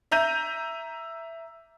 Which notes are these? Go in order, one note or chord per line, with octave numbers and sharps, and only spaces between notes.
E5 A#5 G6 D#7